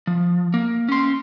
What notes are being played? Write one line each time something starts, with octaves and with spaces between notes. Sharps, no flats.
F3
A#3
C#4 C6